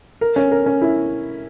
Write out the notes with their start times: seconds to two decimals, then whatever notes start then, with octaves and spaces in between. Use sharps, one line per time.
0.21 A#4
0.36 C#4
0.52 A#4
0.66 C#4
0.82 E4